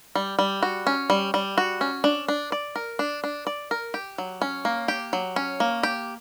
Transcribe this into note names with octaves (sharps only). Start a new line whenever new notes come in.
G3
G3
F#4
C#4
G3
G3
F#4
C#4
D4
D4
D5
A#4
D4
D4
D5
A#4
G4
F#3
C#4
A#3
G4
F#3
C#4
A#3
G4